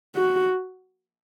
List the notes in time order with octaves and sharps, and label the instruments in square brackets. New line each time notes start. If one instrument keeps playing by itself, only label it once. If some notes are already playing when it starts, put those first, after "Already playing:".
[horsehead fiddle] F#4